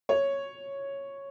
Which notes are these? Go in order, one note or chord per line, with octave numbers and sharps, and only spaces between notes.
C#5